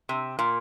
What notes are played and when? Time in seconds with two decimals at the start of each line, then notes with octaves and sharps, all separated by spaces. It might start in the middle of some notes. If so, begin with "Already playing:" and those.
0.09 C3
0.39 A#2